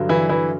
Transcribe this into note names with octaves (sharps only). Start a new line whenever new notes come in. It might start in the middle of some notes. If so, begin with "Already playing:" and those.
Already playing: G2 D3 F#3
E3 E4
E3 E4